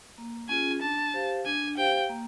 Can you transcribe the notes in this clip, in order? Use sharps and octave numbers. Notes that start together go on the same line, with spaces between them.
A#3
C#4 F4 G#4 G#5
D4 A5
G4 C5 F5
D4 G#5
G4 C5 F5 G5
A#3